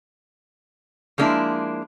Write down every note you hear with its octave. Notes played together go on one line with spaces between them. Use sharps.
F3 G#3 A#3 D4 E4